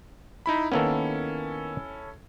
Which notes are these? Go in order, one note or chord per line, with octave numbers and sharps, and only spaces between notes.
D#4 E4 B5
D#3 A#3 B3 C#4 E4 A4